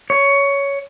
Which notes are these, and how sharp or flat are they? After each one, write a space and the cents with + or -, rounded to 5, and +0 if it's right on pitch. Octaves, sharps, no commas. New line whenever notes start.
C#5 +10